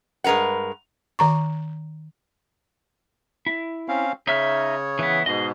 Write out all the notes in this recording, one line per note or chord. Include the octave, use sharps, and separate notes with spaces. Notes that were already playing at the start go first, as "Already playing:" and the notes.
G2 G#3 A#4 B4 F#5
D#3 A#5 C#6
E4
C4 C#4 F5
C#3 D#4 C#5 E5 F6
E3 B3
G#2 B2 G#4 D#5